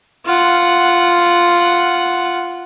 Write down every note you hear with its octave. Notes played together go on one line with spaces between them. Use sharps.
F4 F#5